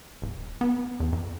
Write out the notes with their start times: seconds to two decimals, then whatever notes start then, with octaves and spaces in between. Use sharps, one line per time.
0.22 D1
0.61 B3
1.00 E2
1.13 F2